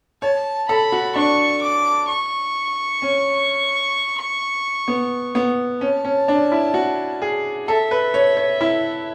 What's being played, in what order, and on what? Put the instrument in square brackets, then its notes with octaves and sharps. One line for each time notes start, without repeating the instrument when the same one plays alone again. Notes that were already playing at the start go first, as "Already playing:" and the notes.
[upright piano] C#5 [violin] A5
[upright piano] A4 [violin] B5
[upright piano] F#4
[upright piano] D4 [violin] C#6
[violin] D6
C#6
[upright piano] C#4
B3
B3
[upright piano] C#4 [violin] A5
[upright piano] C#4
D4
E4
F#4
G#4
[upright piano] A4 [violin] E5
[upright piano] B4
C#5
C#5
E4